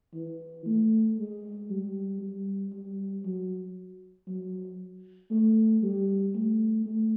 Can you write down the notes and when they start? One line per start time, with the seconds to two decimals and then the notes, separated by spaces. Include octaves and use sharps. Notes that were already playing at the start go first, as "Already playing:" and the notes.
0.15 E3
0.66 A3
1.18 G#3
1.70 G3
2.21 G3
2.73 G3
3.25 F#3
4.28 F#3
5.30 A3
5.83 G3
6.35 A3
6.86 A3